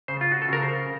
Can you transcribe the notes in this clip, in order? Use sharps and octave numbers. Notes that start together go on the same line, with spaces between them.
C#3 C5
F4
F#4
A4
C#3 A#4
C5